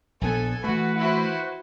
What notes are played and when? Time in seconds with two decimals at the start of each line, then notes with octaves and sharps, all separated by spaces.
0.21 A#1 B3 A4 G#5
0.64 E3 A3 F#4 B4
0.98 E4 F#4 C5